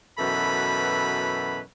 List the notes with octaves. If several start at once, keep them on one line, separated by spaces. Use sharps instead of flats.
F#2 B2 E3 A4 B4 B5